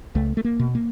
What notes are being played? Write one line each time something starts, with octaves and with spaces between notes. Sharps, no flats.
C#2 A3
A3
A#3
B2
A#3